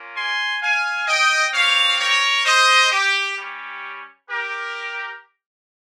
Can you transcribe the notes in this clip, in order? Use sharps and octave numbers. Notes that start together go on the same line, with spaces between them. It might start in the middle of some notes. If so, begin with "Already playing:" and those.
Already playing: A#3 C#4 F4
G#5 C6
F5 G#5
D#5 G5
C4 G4 C#5 F5
A#4 C#5
C5 D#5
G4
G3 C#4 G4
G4 A#4